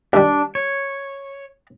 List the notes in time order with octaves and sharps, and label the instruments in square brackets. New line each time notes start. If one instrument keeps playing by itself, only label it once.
[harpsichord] D#2 G3 [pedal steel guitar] D4
[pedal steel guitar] C#5